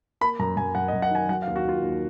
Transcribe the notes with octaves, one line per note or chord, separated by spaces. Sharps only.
A#3 B5
F#2 A#5
F#2 G#5
F#2 F#5
D#5
F#2
F#5
D#3 G#5
F#3 F#5
F5
D#2
F#4
D#2 F4
D#2